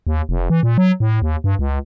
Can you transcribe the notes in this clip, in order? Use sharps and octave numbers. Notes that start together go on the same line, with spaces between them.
D#2
F1
E3
A#2
F#3
A2
D#2
G2
C#2